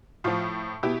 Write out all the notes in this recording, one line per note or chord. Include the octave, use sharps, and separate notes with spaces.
A2 F3 F4
B2 E4 G4